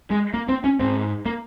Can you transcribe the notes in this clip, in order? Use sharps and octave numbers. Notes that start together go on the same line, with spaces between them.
G#3
A#3
C4
C#4
G#2 C4
A#3